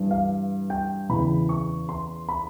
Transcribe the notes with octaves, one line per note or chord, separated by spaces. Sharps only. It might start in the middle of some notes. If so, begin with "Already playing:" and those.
Already playing: G2 E3
F5
G5
E2 C#3 E3 B5
C#6
C6
B5